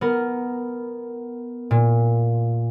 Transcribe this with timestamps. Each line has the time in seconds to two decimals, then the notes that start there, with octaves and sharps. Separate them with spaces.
0.01 B3 A#4
1.71 A#2